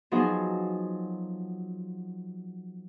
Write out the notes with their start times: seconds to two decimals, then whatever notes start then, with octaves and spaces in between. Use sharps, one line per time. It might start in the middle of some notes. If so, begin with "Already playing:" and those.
0.11 F3 F#3 B3 D#4 G#4